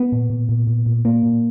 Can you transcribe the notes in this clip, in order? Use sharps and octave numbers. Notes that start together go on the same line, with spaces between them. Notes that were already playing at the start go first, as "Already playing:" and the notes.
Already playing: B3
A#2
A#2
A#2
A#2
A#2
A#2 A#3
A#2